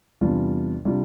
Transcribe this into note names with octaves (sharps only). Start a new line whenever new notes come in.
E2 C3 G3 D4 F4
C3 G3 D4 F4